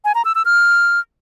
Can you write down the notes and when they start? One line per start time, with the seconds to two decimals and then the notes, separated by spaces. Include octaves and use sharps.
0.05 G#5
0.15 A#5
0.25 E6
0.35 E6
0.45 F6